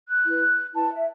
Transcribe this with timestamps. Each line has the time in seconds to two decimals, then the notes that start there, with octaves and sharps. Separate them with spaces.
0.09 F#6
0.25 E4 B4
0.73 E4 B4 A5
0.90 E5